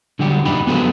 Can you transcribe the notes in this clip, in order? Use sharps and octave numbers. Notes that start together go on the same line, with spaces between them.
D3 F#3 G3 F#4 G4
C#2 F#2 D4 D#4 G4 B5
B3 F#4 G#4 A4 B4 C5